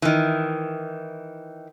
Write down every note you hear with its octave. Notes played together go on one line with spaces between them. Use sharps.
D#3 E3